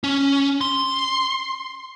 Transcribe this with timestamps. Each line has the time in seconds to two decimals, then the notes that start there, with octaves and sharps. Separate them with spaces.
0.04 C#4
0.61 C6